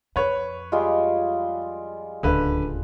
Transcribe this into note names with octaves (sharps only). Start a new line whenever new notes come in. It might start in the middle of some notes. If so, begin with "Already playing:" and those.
F2 B4 C#5
G3 G#3 F4
D1 C#2 D3 B4